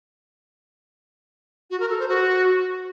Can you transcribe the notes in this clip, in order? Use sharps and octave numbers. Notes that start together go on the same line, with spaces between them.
F#4
A#4
A4
C5
F#4